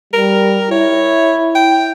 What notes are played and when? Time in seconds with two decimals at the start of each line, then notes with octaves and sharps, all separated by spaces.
0.13 G3 A#4
0.71 E4 C#5
1.55 G5